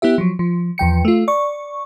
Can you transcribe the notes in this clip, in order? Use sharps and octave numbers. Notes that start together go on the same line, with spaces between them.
B3 E4 G4 E5
F3 F#3
F3
E2 F3 G5 C#7
A3 F4
D5 C#6